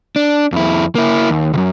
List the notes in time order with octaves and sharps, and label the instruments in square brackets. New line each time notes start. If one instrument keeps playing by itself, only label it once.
[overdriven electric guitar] D4
F2 E4
A#3 E4
D#2
C#2 F#2